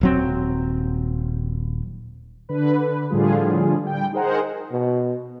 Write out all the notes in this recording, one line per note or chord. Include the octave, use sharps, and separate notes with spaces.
D#1 F#3 C4
D3 B4
A2 D3 F3 G3 F4 G#4
G3 G5
D#4 G#4 A#4 C5 F#5 A#5
B2